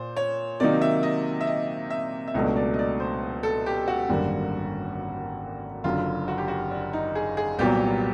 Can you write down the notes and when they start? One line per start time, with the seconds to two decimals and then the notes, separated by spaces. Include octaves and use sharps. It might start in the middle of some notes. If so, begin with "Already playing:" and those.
Already playing: A#2 C5
0.17 C#5
0.60 C3 D#3 F#3 A#3 D#4 D5
0.82 E5
1.03 D#5
1.41 E5
1.47 D#5
1.90 E5
2.28 E5
2.34 C#2 B2 F#3 A3 D4 D#5
2.56 D5
2.74 D#5
2.79 D5
3.00 C5
3.43 A4
3.66 G4
3.88 F#4
4.09 G#1 F#2 D3 G3 A#3
5.84 F#1 F#2 D3 F4
6.28 F#4
6.38 G4
6.48 F#4
6.71 D4
6.93 D#4
7.15 G#4
7.37 G#4
7.58 C2 A#2 F#3 B3 G4